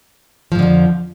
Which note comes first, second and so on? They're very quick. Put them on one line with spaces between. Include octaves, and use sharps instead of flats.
F3 G#2 D3 F2